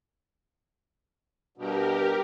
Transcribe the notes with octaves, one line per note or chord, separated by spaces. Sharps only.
G2 B2 G4 A#4